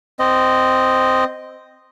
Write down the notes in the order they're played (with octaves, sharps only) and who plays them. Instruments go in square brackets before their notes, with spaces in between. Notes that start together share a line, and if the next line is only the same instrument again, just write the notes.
[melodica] C4 D#5